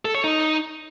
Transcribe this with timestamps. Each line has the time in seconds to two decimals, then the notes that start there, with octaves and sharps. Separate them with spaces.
0.05 A4
0.15 C#5
0.24 D#4